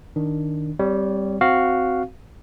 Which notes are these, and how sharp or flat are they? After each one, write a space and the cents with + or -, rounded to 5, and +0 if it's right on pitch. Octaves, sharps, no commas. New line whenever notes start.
D#3 +0 D4 +0
G3 +0 C4 +0 C#5 +25
C4 +0 F#4 +0 F5 +0